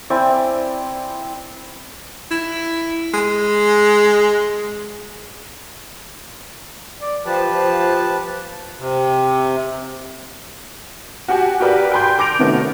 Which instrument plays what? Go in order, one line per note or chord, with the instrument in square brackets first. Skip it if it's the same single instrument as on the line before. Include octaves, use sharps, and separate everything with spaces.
[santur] C4 E4 D5 G#5
[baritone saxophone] E4
G#3
[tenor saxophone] D5
[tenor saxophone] F3 [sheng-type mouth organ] G4 B4 A5
[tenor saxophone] F3
[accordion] C3
[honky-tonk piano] F#4 G4 F#5 G#5 A5
F#4 G4 A#4 B4 D5
G5 G#5 B5 C6 G6
A5 D6 G6 A#6 D7 F7
C3 D#3 A3 B3 C#4 F#4